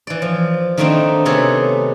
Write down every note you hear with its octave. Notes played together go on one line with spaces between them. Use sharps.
E3 D5
F3
D#3 A3 A#3 C4 D4 D#4
C3 A3 B3 G#4 A4 C#5